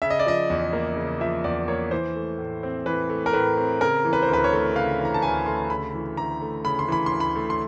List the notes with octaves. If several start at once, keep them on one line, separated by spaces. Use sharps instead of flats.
C#3 E5
D#5
D5
F3 D#5
E2
A#3
C#3
F3 E5
E2 D5
A#3 C#5
E3 C5
A3
A2
C4
E3 B4
A3
A#4
A2 B4
C4
C#3 A#4
E3
B4
C5
D2
B4
C#5
A3
C#3 F5
E3
A#5
A5
D2 G#5
A3 C6
C#3 B5
E3
D2 A#5
A3
C#3 B5
C6
E3 B5
C6
D2
B5
A3
C6